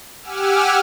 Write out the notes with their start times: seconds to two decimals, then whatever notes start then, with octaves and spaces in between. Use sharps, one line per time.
0.21 G4 F#5 G#5 D6 E6 F6